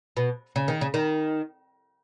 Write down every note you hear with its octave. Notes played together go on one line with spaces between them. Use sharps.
B2
C#3
D#3
C#3
D#3